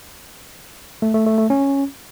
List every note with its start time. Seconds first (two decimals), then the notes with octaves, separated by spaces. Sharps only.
1.02 A3
1.14 A3
1.26 A3
1.38 A3
1.50 C#4